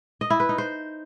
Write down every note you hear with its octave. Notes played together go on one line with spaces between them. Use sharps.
D#5
E4
B4
D#4
C5